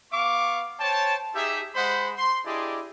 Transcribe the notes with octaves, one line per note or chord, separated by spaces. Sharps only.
B3 F5 C#6 D6
C5 C#5 G5 A5
D#4 G4 G#4 E5
G#3 C5 D#5 F#5 B5
C6
D4 E4 G4 G#4 D5 D#5